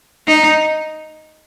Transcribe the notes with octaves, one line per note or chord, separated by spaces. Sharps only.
D#4